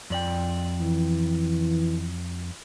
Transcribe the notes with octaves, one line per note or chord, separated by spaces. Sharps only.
F2 D5 G5
E3